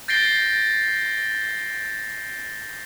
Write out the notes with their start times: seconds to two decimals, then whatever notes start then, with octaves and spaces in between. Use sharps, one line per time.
0.08 G6 A6 A#6 C7 D7 G7